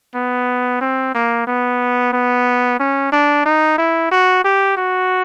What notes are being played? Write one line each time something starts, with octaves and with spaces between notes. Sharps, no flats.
B3
C4
A#3
B3
B3
C#4
D4
D#4
E4
F#4
G4
F#4